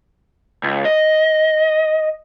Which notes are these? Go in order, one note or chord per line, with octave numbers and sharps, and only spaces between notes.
C#2
D#5